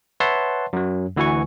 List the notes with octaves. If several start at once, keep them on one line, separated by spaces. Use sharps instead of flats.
B4 C#5 E5 F#5 A5 C6
F#2 F#3
D2 E3 F#4 B4 G#5 C#6